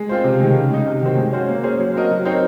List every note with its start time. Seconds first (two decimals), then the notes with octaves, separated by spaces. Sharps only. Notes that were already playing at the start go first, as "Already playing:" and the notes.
Already playing: G#3
0.09 C4 F4 C5
0.24 C3
0.40 D#3 G#3
0.55 C#3
0.70 G#3 D#4
0.86 C3
1.02 D#3 F#3 C4
1.17 G#3
1.33 C#4 F#4 C5
1.48 A#3
1.63 C#4 G#4 C5
1.79 F#3
1.94 C4 F#4 A#4 D#5
2.11 F#3
2.25 C4 D#4 A#4 C#5